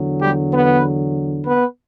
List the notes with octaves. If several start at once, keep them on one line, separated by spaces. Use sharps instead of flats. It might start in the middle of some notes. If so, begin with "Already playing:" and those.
Already playing: E2 D3 F#3
G3 G4
B3 B4
B3 B4